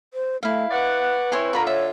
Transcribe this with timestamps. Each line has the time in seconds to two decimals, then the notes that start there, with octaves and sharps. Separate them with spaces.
0.14 C5
0.43 A3 E4 F5
0.71 B4 C#5 D5 F#5
1.32 C4 E4 C#5 G#5 C6
1.53 D3 F4 A#4 B5 C#6
1.67 C#5 E5